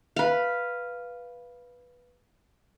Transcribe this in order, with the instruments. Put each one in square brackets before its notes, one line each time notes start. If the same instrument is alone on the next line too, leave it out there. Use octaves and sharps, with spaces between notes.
[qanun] B4 F5